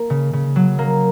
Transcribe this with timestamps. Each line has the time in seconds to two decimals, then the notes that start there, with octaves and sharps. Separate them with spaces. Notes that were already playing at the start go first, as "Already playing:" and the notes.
Already playing: A#3
0.10 C#3
0.33 C#3
0.56 F#3
0.79 A#3